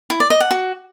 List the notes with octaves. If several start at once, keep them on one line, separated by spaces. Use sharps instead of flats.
E4
D5
D#5
F#5
F#4